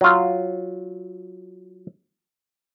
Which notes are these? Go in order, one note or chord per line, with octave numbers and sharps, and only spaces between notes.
F#3 F4